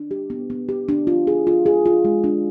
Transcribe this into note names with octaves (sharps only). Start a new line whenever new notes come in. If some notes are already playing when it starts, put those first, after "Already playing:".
Already playing: D4
G4
B3
B3
G4
D4
F4
G#4
F4
G#4
F4
G#3
D4